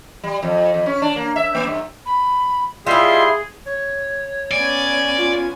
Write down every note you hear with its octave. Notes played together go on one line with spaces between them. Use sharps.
G3
F2
F2
C#4
D4
A#3
E5
A#3
G2
B5
G3 E4 F4 G#4 D#5 E5 C6
C#5
B3 C#4 D5 G#5
F4